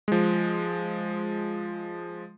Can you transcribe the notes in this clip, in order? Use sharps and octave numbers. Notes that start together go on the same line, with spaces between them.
F3 G#3